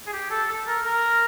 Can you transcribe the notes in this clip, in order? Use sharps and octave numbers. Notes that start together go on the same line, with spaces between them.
G#4
G4
A4
A4
A#4
A#4